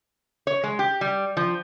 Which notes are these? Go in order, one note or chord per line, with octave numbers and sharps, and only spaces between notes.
C#5
G#3
G4
G3
F3